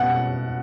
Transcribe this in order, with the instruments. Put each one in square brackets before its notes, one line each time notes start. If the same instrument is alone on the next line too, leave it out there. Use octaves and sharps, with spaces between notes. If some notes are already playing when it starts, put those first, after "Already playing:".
Already playing: [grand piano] B2 F#5